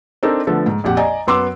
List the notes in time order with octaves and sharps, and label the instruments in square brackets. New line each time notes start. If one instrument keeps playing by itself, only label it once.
[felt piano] C4 D4 D#4 A4 A#4
D3 F3 A3 B3 A4
G#2
A#1 F2 G4 F#5
D5 D#5 G#5 A#5
F#2 B3 C6 D6 E6